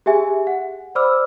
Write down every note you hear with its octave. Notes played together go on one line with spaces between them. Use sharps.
G4 G#4 E5 G#5
F#5
C5 D5 B5 D6 E6 F6